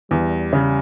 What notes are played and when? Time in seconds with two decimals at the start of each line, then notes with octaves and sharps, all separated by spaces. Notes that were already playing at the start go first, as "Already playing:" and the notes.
0.11 E2 G3
0.53 C#3